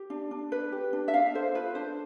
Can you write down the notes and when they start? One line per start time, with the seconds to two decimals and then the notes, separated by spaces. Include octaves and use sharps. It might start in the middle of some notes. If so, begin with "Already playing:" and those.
Already playing: G4
0.10 D4
0.31 D4
0.52 B4
0.72 G4
0.93 D4
1.08 E5
1.13 D4 F5
1.35 A4 C5
1.55 F4 B4
1.75 D4 C5